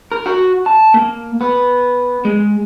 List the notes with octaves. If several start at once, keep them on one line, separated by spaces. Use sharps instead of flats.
A#4
F#4
A5
A#3
B3
G#3